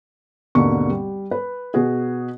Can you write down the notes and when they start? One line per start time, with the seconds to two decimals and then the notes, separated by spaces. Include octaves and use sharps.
0.55 G#1 D#2 B2 D3 A#3 C#6
0.89 G3
1.31 B4
1.74 B2 B3 F#4 G#4